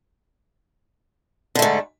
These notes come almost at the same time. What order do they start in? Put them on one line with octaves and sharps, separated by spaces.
D3 A3 G#2